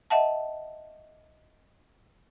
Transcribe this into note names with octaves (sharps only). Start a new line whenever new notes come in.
D#5 E5 F#5 A5